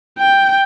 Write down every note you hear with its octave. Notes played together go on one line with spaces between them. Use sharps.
G5